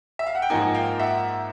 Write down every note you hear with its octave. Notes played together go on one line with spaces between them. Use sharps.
E5
F5
F#5
G5
G#2 F3 A#3 D#4 F#5 G#5
F5 G5
E5 F#5